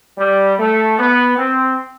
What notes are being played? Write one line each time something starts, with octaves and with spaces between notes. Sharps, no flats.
G3
A3
B3
C4